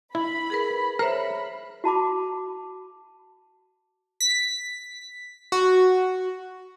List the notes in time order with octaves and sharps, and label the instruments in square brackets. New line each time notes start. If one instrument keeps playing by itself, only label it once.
[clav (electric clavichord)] E4 [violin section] B5
[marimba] G#4 A#4 B4
[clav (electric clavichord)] A#4 [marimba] C5 C#5 E5 [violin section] B5
[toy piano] F#4 A5 B5 D6
[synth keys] B6
F#4